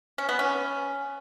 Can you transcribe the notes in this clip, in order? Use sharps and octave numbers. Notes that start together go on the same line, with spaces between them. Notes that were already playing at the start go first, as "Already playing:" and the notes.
C#4
B3
C#4